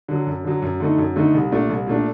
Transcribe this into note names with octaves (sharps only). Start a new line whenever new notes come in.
D3 F#3
F#2
D3 F#3
F#2
D3 A3 D#4
F#2
D3 A3 D#4
C2
A#2 A3 D4
C2
A#2 A3 D4